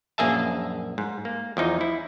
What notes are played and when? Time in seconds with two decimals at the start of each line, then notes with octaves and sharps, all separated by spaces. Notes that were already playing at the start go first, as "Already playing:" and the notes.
0.18 A#1 F#2 A#3 G#4 E5 A5
0.98 G#2
1.25 A#3
1.57 E2 F3 D#4
1.81 E4